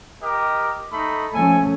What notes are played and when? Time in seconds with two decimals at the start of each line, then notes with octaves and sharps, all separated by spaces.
0.23 G4 A#4 D#5
0.92 A3 D#4 B5
1.34 F3 A3 C#4 A4 G#5